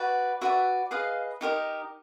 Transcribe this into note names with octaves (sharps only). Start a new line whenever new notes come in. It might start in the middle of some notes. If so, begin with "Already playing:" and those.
Already playing: F#4 B4 D5
F#4 B4 D5 E5
G#4 B4 D#5 F5
D#4 G4 A#4 D#5